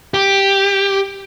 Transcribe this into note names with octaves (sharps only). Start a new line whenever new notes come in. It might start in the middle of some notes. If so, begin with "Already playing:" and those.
G4